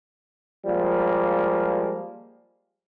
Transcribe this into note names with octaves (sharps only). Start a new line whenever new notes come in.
F3 G3 G#3 A#3